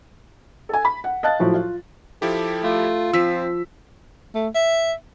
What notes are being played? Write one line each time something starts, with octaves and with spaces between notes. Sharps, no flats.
A4 G#5
B5
F#5
D#5 F5 A5 F#6 A6
A2 F3 F#3
F4
F3 E4 G4 A4
A3 F4
F3 C4 E6 B6
A3
E5